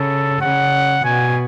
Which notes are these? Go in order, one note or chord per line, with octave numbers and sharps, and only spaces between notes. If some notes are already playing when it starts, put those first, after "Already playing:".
Already playing: C#3 A4
C#3 F#5
B2 G#5